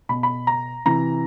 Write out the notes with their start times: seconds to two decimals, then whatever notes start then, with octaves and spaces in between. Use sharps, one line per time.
0.09 B2 B5
0.23 B5
0.47 A#5
0.85 C3 E3 A#5